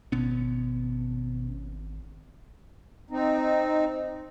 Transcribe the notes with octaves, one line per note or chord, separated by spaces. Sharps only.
G#1 B2 B3 C#4
C4 D#4